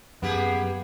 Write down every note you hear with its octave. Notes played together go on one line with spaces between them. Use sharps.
F#2 A#3 B3 G4 G#4